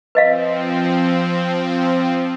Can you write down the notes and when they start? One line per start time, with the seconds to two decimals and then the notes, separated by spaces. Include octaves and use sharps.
0.15 F3 C4 B4 D#5 F5